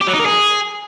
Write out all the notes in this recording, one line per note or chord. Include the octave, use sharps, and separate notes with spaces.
G4
F#3
D#4
A#4
G#4